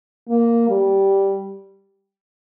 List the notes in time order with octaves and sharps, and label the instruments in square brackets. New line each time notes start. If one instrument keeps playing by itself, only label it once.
[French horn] A#3
G3